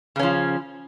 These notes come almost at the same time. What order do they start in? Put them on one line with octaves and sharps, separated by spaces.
C#3 C#4 F3